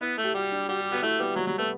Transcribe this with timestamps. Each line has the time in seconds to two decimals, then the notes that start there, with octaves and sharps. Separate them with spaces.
0.01 B3 E4
0.18 A3
0.24 G4
0.34 G3 F#4
0.52 D4
0.69 G3 F#4
0.80 G4
0.91 B3 F#4
1.02 A3 E4
1.19 G3 B3
1.36 F#3 G3
1.47 F#3 G3
1.58 A3 B3